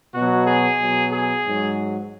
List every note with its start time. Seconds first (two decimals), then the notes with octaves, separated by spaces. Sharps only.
0.14 B2 F#3 F#4
0.46 G#4
0.79 B2 F#3
1.12 G#4
1.45 G#2 F#3